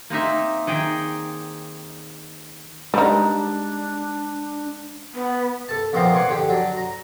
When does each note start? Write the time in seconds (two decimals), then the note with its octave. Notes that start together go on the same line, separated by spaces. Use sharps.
0.10 A#3 C4 D#4 E5
0.67 D#3 G#4 G5
2.94 G3 G#3 D4 D#4
5.14 B3
5.69 A4 A5
5.93 F2 A#2 G#3 B3 C4 C6
6.14 F#5 G#5 C6 D6
6.29 D3 G4
6.49 F#3 D4
6.76 A#5